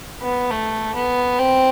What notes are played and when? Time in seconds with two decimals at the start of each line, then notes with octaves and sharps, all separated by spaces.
0.22 B3
0.51 A3
0.95 B3
1.39 C4